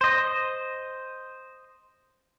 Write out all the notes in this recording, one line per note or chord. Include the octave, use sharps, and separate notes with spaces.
C5 D#5